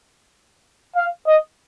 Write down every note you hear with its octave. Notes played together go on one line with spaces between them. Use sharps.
F5
D#5